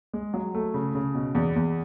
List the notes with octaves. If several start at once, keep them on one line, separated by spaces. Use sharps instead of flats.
G#3
F#3
A3
C#3
C#3
B2
E2
E2